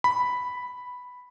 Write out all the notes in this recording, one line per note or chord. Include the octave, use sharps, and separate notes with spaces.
B5